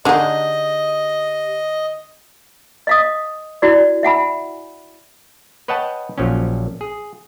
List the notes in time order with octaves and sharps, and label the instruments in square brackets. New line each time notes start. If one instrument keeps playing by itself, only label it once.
[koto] D3 G#4 [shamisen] D4 D#4 [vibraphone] G4 [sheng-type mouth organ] D#5
[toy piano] D#5 F5 D#6
E4 F#4 D5
E5 F#5 G#5 B5
[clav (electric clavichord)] B4 C#5 D#5 F#5 G5 A5
A#1 F3 F#3 C#4
G#4